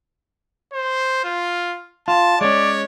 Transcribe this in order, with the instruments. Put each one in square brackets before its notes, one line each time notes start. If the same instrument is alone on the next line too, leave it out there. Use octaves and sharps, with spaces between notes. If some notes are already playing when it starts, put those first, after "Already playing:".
[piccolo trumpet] C5
F4
[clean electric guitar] F4 [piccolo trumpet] A5
[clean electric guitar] G#3 C#4 [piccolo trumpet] C#5 [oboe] D5